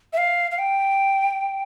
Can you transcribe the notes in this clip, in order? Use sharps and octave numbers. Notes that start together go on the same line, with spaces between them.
E5
F5
F5
G5